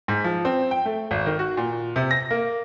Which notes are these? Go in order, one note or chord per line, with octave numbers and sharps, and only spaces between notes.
G#2
F3
C4
G5
A3
G#1
D#3
F#4
A#2
C3
A#6
A#3